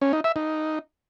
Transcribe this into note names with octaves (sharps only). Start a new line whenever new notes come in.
C#4
D#4
E5
D#4